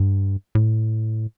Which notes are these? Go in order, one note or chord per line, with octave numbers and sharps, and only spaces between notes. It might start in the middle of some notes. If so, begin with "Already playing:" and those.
Already playing: G2
A2